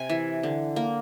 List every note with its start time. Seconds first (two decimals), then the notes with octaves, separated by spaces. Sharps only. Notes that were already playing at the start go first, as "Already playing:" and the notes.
Already playing: C3 G#5
0.10 E3
0.43 D3
0.76 A#3